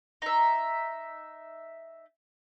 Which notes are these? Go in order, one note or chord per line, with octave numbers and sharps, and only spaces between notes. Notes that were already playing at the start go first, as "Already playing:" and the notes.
D#4 E5